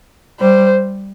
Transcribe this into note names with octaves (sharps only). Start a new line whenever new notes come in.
G3 C5